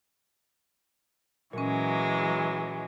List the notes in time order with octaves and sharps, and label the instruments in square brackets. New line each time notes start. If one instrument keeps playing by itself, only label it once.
[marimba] A#2 C#4 [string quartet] E3 F#3 G#3